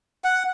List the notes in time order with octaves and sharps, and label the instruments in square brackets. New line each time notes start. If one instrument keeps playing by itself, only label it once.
[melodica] F#5